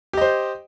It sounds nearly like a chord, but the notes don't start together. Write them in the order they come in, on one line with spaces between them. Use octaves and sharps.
G4 D#5 C5